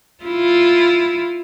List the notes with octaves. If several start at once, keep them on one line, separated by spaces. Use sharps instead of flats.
E4 F4